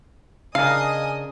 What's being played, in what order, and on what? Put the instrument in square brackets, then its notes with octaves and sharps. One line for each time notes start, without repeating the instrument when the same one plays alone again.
[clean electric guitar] C#3 D4 A#4 [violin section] D#5 G#5 D#6 [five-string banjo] F5